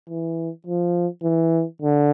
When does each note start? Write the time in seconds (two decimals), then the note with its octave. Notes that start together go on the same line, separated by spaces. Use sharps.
0.09 E3
0.67 F3
1.23 E3
1.82 D3